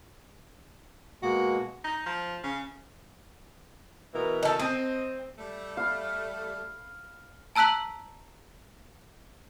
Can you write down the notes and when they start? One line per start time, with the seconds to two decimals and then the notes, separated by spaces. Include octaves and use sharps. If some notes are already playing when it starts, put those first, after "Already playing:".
1.23 B2 G#3 A#3 F#4
1.84 D#4
2.06 F3
2.44 C#3
4.15 B2 E3 A#4
4.43 D#4 A4
4.60 C4 D#5
5.38 G3 A3
5.77 F5 B5
7.56 A5 A#5 E6 F#6 B6 F#7